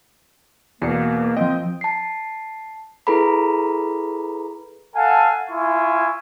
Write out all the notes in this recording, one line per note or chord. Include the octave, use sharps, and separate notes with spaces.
E2 B2 A#3 D5 C7 C#7
F3 C4 D#5 G5
A5 C7
E4 G#4 A4 B4 A#5 B5
A4 F5 F#5 G#5 A5
E4 F4 G#5 C#6